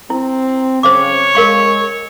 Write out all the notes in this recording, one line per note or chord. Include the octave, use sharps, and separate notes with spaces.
C4 E4
C#3 C5 C#5 F5 D6
G#3 A#4 F5 C#6